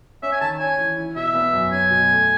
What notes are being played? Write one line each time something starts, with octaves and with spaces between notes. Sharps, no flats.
C#4 E5
G#5
D#3 A5
C#4 G#5
E3
E4
B2 E5
B3
F#2
C#4 G#5
B2
A3